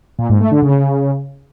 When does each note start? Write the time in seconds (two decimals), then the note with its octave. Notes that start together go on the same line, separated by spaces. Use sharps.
0.19 A#2
0.29 G#2
0.40 A3
0.51 D3
0.62 C#3